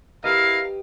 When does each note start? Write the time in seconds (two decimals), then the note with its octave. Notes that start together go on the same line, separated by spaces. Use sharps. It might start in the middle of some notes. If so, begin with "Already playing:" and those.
0.24 E4 G4 A#4 B4 D#5 F5